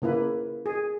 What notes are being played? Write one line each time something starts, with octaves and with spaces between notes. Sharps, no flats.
C#3 A#3 E4 B4
G#4